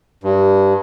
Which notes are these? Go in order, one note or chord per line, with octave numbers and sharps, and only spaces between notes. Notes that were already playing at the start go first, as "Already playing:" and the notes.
G2